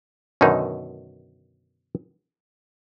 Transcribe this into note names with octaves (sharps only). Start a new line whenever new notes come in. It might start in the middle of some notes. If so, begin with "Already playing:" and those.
F#2 B2 D3 D#3 D#4